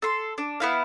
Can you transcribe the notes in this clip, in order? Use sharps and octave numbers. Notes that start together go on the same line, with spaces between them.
A4 C6
D4
B3 E4 F5